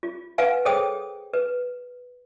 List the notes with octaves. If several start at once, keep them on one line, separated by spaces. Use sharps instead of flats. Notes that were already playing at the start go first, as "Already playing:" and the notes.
F4
B4 F5 F#5 G#5
G#4 A4 C5 C#5 G5 D#6
B4